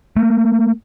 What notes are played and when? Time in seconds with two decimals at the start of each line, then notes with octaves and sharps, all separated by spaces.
0.16 A3 A#3